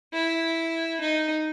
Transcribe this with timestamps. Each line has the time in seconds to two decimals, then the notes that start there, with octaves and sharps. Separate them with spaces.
0.13 E4
1.00 D#4